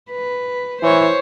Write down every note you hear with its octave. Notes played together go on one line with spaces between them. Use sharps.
B4
E3 C5 C#5